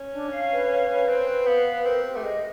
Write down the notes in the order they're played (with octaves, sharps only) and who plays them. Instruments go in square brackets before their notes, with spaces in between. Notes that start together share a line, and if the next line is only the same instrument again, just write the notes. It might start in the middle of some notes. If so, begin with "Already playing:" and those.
Already playing: [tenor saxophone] C#4
[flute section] D4
F5
B4
F5
B4
[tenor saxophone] C4 [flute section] B4
[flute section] B4
[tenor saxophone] B3 [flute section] F5
[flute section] B4
[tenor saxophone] C4 [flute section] A#4
[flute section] G4
[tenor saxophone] A3
[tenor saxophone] G#3 [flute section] D#5